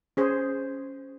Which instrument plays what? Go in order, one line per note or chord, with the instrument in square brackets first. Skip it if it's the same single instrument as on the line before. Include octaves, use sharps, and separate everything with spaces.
[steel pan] C#4 G#4 C5